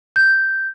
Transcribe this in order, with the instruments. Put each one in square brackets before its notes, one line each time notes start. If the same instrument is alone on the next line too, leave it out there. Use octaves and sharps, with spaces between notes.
[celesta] G6